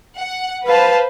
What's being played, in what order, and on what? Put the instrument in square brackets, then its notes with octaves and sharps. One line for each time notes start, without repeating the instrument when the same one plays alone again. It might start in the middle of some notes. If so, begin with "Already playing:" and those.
[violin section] F#5
[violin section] B4 C5 [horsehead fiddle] F5 A5